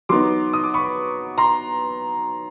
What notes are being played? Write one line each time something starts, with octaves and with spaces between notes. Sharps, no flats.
F#3 B3 D#4 C6 D6
D#6
D6
B5 C#6
A#5 C6